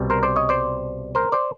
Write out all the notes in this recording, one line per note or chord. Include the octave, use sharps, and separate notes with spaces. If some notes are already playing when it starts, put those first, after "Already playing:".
Already playing: C2 B2 G3 C4
A#4 C5
C5 D5
C#5 D#5
C5 D5
A#4 C5
C5 D5